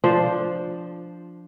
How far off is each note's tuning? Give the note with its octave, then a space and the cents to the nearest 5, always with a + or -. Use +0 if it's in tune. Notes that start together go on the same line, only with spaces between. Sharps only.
F3 +0 D4 +0 C5 +0